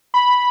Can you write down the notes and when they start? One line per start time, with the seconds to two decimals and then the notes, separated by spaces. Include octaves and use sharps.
0.14 B5